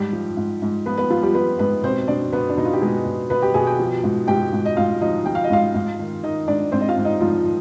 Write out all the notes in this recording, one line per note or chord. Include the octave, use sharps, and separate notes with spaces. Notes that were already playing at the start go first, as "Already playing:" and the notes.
Already playing: G#2 G3 G4
F3
G#2
G#2
F3 B3 B4
B3 B4
F3 F4
G3 G4
F3 B3 B4
G#2 B3 B4
B2 C4 C5
B2 D4 D5
B2 B3 B4
D4
B2 D#4
F4
G4
B2 G#3 G#4
B2
B2 B3 B4
G4 G5
B2 G#4 G#5
G4 G5
F3
G#2
G#2 G4 G5
G#2
D#5
G#2 F4 F5
F3 D#4 D#5
F3 G5
F5
D#5
G#2 F4 F5
G#2
D#3
D#3 D#4 D#5
G#2 D4 D5
G#2 C4 C5
D#5
F4 F5
G#2
D#4 D#5
G#2 F3 F4
D#3